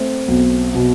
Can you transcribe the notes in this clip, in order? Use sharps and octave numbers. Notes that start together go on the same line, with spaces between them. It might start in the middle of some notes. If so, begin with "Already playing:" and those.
Already playing: A3 C4
B1
B2